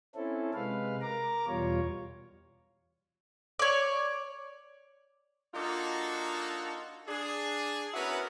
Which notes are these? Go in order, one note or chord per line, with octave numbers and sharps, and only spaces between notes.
C4 C#4 E4 A4
C3 G#3 B4 F5
A#4 A#5 D6
E2 B2 G3 F4 C#5
C#5 D5
A#3 D4 D#4 F4 F#4 A4
D4 G#4
B3 C#4 E4 F#4 A#4 B4